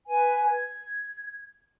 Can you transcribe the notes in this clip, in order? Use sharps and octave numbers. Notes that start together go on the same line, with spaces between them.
B4 G#5
G#6